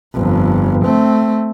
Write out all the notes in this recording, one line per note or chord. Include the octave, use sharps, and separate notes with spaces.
G1 F2
A3 C4